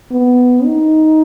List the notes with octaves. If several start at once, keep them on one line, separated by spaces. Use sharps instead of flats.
B3
D#4